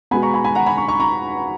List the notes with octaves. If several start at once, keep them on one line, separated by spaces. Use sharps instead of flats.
B2 G#3 B3 G#5 B5
A#5 C#6
G#5 B5
G#5 B5
F#5 A#5
G#5 B5
A#5 C#6
A#5 C#6
A#5 C#6